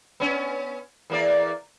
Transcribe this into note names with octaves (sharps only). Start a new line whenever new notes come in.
B3 C#4
E2 A#3 D5